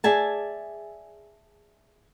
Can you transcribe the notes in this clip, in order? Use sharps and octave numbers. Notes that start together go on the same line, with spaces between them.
G#4 D5 E5 G#5 A5